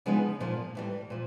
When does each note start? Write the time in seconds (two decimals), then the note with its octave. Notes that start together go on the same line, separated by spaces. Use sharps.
0.06 C#3 F3 G#3 B3 D#4
0.40 A#2 F3 A#3
0.75 A2 E3 G3
1.10 A#2 F3